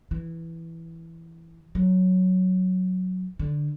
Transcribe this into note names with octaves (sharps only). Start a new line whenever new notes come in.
E3
F#3
D3